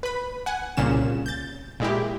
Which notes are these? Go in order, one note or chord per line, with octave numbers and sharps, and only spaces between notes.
B4 B5
F#5 G#5
C2 A#2 C#3 C#4 E7
G6 A6
A#2 G#3 E4 G4